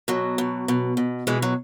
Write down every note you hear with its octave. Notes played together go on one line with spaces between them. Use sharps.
B2 F#3
B2
B2
B2
B2 E3 G#3
F#3